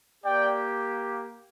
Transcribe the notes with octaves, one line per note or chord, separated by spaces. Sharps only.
A#3 G4 D5 G5